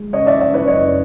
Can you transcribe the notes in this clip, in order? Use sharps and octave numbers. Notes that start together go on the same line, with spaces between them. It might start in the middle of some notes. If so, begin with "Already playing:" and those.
Already playing: G#3
C#3 C#5 D#5
D5 E5
C#3 D5 E5
B4 C#5
F#1 C#5 D#5